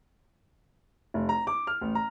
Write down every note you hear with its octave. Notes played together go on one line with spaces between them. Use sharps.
F1
A#5
D6
F6
A1
A#5